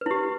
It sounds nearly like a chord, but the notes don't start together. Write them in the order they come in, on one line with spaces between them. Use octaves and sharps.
B4 E4 G4